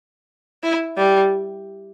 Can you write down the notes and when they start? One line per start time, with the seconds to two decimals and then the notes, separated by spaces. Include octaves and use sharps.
0.63 E4
0.98 G3